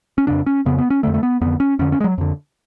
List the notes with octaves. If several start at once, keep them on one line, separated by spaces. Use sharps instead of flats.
C#4
F2 C#3 D4
C#4
F2 C#3 B3
B3
C#4
F2 D3 A3
A3
B3
F2 D3 B3
C#4
F2 D3 C#4
C#4
G#3
F#3
F2 D3